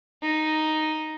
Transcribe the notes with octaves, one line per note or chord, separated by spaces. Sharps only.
D#4